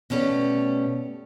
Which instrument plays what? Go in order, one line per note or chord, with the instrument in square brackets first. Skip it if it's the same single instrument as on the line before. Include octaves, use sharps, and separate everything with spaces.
[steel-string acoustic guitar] B2 A3 C#4 G4 D5